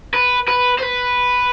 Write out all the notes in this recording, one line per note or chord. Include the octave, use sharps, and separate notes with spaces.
B4
B4
C5
B4